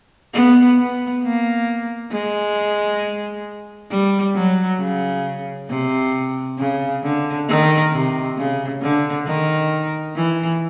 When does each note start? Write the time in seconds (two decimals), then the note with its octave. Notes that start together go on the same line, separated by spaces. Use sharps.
0.34 B3
0.79 B3
1.24 A#3
2.12 G#3
3.91 G3
4.36 F#3
4.80 C#3
5.69 C3
6.59 C#3
7.03 D3
7.49 D#3
7.93 C3
8.37 C#3
8.82 D3
9.27 D#3
10.16 E3